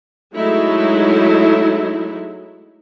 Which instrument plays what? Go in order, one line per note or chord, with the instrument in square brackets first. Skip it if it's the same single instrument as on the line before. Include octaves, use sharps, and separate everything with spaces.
[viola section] F#3 G#3 A3 D#4 E4